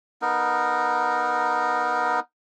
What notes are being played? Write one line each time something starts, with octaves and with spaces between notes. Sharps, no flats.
B3 D#4 A#4